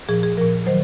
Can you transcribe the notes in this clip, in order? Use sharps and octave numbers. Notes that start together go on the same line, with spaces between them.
A#2 F3 G#4
G#4
A#2 F3 A#4
D#3 F#3 C5